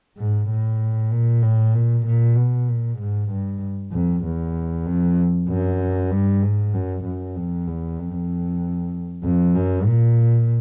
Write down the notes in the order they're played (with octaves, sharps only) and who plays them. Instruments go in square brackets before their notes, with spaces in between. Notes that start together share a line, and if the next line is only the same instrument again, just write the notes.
[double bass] G#2
A2
A#2
A2
A#2
A#2
B2
A#2
G#2
G2
F2
E2
F2
F#2
G2
G#2
F#2
F#2
F2
E2
F2
F2
F#2
A#2